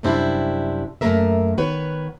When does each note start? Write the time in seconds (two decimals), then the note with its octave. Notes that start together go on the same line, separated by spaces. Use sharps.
0.03 F#2 C3 G3 C4 D4 E4
1.01 F#2 B2 A3 A#3 A#4 E5
1.58 D#3 B3 B4 C#5